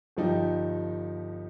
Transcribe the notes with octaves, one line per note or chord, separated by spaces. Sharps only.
G1 G2 F3 D#4 G4